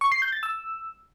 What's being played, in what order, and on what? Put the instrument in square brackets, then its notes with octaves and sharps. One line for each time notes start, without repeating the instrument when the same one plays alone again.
[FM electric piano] C#6
C7
G6
A6
E6